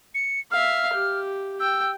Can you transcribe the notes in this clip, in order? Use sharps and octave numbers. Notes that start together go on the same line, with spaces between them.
C#7
E5 F5 F6
G4
G5 E6